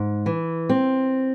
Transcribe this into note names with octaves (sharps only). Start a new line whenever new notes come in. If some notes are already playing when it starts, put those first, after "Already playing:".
Already playing: G#2
E3
C4